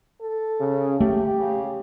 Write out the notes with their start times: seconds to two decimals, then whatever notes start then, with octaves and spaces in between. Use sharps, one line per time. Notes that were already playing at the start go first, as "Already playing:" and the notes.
0.21 A4
0.61 C#3
1.00 A3 G4
1.39 C#3